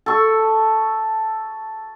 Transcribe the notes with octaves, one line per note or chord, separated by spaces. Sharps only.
A4 C#6